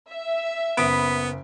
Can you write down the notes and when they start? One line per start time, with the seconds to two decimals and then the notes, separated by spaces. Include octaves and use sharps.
0.11 E5
0.77 F#1 B3 B5 D#6 B6 D7